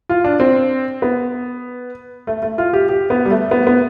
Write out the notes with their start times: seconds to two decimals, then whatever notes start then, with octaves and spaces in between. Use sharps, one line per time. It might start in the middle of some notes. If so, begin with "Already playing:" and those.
0.09 F4
0.24 D4
0.40 C4
1.02 B3
2.27 A3
2.42 A3
2.58 F4
2.73 G4
2.89 G4
3.10 B3
3.26 G3
3.31 A3
3.51 B3
3.67 B3